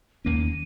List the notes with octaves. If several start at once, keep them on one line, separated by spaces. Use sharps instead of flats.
D#2 D#3 A#3 C#4 D#7